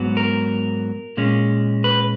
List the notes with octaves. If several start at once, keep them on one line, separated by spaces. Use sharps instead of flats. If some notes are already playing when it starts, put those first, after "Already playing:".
Already playing: G#2 F#3 B3
A#4
A#2 G#3 C#4
B4